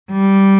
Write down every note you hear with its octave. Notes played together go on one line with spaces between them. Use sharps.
G3